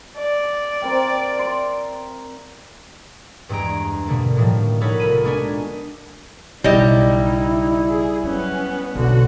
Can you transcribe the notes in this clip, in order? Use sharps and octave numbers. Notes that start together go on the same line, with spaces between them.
D5
C4 A#4 G5
C6
E2 G2 G#3 A#5 D7
B2 D3 A3 A#3
A2 D#3 F3 G3
D#4 A4 A#4 C#5 F#5 B5
C2 F4 B5 D#7
G#3 A#3 B3 D4 F#4 G#5
B1 C#3 G3 D#4 E4 D#5
G#4
F#3 B3 C#4
B1 D3 F#4